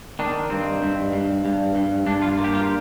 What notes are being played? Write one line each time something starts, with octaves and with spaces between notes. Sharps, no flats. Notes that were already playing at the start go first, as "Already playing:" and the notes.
D#3 D4
G2 C4
G2
G2
G2
G2
G2 D4
F4
A#3
G4
F4